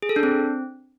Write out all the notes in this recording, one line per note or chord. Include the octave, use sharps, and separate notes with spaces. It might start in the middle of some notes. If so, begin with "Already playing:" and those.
G#4
A4
D4
C4